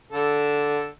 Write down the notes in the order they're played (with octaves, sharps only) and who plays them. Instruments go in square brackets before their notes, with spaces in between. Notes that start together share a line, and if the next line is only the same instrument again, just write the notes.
[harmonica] D3 A4